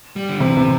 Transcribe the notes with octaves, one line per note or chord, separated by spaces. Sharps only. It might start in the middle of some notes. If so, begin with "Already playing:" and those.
G3
D3
C3 E3
C3